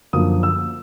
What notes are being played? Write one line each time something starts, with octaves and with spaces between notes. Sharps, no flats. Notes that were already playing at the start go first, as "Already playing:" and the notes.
F#2 D3 F3 A#3 D#6
E6